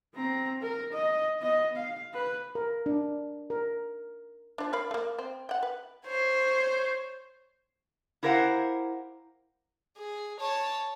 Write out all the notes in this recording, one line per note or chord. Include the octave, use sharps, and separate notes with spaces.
C4 A#5
A#4
D#5
B3 D#5
F5
B4
A#4
D4
A#4
F3 D4
A#4 F5 B5
A3 A#3
C4
F#5 G5
B4
C5 C#5
E4 G4 A#4 C5 F5 F#5
G#4
C#5 A5